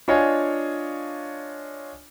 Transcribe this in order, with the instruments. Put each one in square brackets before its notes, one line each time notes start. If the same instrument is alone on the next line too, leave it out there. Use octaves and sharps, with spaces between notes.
[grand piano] D4 F4 C#5 D#5 F5 G#5